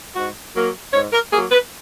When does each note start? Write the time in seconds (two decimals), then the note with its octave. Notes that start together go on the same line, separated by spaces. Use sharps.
0.15 G#2 F#4
0.55 F#3 A#3
0.93 G#2 C#5
1.13 A#4
1.32 A#3 G#4
1.35 F#3
1.51 B4